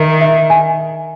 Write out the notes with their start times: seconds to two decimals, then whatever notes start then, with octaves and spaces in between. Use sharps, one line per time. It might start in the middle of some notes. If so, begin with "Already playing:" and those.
Already playing: D#3 E5
0.21 E5
0.50 G#5